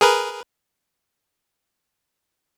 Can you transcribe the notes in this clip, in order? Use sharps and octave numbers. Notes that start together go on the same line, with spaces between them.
G#4 A#4 B4